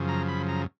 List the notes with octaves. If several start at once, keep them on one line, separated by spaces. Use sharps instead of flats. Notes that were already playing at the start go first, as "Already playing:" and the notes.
Already playing: F#2 C#3 F3
A#5
B5
A#5